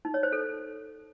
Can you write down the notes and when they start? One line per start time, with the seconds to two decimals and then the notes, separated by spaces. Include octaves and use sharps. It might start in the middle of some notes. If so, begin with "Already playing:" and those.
0.05 D#4
0.14 C#5
0.23 C5
0.32 A4